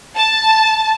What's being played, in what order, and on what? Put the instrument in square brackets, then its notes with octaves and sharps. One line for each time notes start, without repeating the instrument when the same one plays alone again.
[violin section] A5